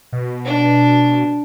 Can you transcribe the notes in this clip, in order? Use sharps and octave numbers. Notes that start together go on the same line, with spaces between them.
B2
D4